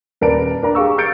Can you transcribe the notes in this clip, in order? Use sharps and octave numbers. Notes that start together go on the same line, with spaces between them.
D#1 A#4 B4 D5 A5 D7
D4 A#4 A#5
G4 G#4 F5 C#6 E6
F6 G6 A6 C#7 D7